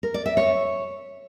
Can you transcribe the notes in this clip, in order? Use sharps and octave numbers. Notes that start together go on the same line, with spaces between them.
A#4
D5
E5
C#5